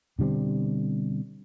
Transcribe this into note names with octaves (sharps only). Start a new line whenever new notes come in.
B2 D3 G3 C4